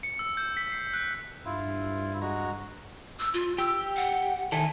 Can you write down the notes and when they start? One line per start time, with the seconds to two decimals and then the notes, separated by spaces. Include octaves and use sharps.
0.03 C#7
0.19 E6
0.37 G6
0.57 B6
0.72 C7
0.94 F#6
1.46 G2 E4 F4
2.21 G#3 F#4 A#5
3.19 E6
3.34 F4
3.58 G4 E6
3.97 F#5
4.52 D#3 E4 A4 G#5